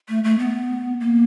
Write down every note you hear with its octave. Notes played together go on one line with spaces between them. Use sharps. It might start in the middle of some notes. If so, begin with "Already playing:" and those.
A3
A3
B3
A#3